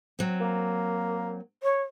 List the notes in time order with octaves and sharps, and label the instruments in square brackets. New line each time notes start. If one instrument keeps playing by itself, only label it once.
[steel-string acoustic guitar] F#3 C4
[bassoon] A#3
[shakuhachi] C#5